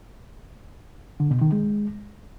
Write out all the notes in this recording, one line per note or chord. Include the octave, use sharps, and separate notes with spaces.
D3
B2
D#3
G#3